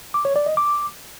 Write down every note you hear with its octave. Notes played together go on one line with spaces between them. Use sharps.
D6
C#5
D5
D#5
D6